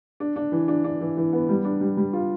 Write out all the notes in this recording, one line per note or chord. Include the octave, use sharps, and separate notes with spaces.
D4
D4
E3
D4
D4
E3
E3
B3
G3
D4
G3
G3
F4